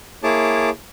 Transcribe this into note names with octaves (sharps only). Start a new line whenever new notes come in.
A#3 E4 G#4 C#5 A5 D6